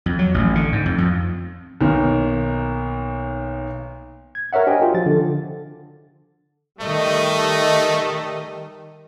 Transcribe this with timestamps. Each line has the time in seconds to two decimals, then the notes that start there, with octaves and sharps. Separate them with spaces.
0.06 F2
0.19 F#3
0.34 A1
0.55 D3
0.72 G#2
0.86 F2
0.98 F2
1.81 B1 D#3 A#3
4.35 G#6
4.53 A#4 C#5 E5 F#5
4.67 D4 G4 C5 D#5 G5 G#5
4.80 F4 F#4
4.94 F3 A6
5.06 D3
6.81 D#3 G3 A3 D#5